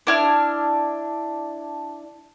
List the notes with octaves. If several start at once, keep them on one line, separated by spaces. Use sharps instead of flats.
D4 E4 F6